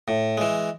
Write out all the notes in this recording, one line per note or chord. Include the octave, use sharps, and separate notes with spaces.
A2
E3 G#3